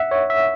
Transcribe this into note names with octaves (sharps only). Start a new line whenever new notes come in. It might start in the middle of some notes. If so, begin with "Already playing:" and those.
Already playing: E5 F#5
C#5
E5